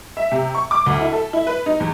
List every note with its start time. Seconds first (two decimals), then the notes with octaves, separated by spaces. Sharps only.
0.17 E5
0.32 C3
0.55 C#6
0.71 D6
0.86 D2
1.01 E4
1.13 A4
1.33 E4
1.47 B4
1.66 D#4
1.80 E2